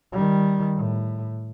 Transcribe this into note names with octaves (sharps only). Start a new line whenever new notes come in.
D#3 G3
A2